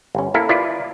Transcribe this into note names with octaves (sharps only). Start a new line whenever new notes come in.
G1 C#4
A#3 E4 A4 A#4
E4 F4 B4 D5